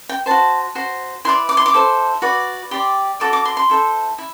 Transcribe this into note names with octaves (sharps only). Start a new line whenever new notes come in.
G5
F#4 C5 A5
F#4 C5
E4 B4 D5 C6
D6
C6
D6
E4 A4 C5
F#4 B4 D5
G4 D5 C6
F#4 A4 D5 D6
D6
C6
C6
E4 A4 C5
E4